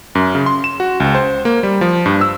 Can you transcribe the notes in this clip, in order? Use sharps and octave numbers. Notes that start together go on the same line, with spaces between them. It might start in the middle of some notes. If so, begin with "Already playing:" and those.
F#2
C#3
C6
E7
F#4
C#2
C5
A#3
G3
F3
G2
E6